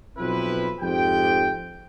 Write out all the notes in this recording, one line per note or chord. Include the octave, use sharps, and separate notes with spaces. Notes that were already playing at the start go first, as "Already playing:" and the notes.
B1 F3 C4 E4 B4
F2 G#2 G4 G5